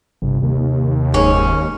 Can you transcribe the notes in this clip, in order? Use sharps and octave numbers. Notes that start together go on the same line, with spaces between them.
G1 C3
D#2
F1 G#2 C#4